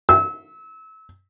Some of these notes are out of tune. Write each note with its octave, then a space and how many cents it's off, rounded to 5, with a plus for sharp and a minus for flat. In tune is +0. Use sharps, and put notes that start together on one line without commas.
E6 -30